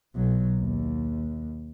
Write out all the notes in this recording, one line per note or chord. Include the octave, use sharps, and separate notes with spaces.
B1 F#3
D#2